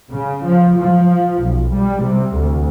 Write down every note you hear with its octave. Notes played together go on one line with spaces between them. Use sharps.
C#3
F3
F3
B1
G3
C3
D2